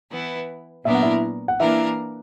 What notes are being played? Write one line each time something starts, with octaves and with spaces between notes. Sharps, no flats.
E3 B3 E4
A#2 F#3 B3 D4 A#4 E5
F#5
E4 E5
F#5
E3 A#3 D4 E4 A#4 E5